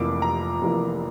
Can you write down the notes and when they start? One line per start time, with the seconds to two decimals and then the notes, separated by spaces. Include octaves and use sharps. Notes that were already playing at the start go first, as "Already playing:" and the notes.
Already playing: F1 F2 E3 A#3 D6
0.22 A#5
0.61 F1 F2 E3 A#3